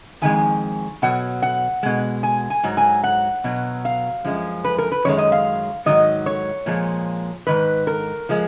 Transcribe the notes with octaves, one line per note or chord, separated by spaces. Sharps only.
F2 D#3 G#3 G#5
B2 F#3 F#5
F#5
B2 G#3
G#5
G#5
G#2 F#3
G#5
F#5
B2 F#3
F5
F#2 F3 G#3
B4
A#4
B4
F#2 D#3 G#3 C#5
D#5
F5
G#2 D#3 F#3 D#5
C#5
A#2 F3 G#3
G#2 D#3 B4
A#4
F3 G#3